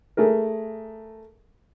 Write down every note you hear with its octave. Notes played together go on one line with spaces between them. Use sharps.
A3 G#4 A#4